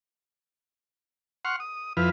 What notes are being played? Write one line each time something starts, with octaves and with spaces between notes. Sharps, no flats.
F#5 C6 C#6 F6
D#6
F2 F3 E4 B4 F6